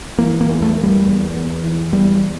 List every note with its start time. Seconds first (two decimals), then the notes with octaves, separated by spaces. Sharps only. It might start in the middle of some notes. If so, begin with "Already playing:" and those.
0.18 E3 A#3
0.41 A#3
0.48 E2
0.62 A3
0.77 A#3
0.83 G3
1.06 E2
1.34 E2
1.64 E3
1.92 E2 G3